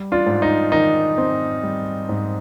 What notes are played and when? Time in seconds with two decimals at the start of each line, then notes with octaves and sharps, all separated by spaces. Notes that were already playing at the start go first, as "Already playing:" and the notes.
Already playing: G3
0.12 D4 F4
0.26 G#2
0.42 D#4
0.72 D#3 D#4
1.18 C4
1.63 G3
2.09 G#2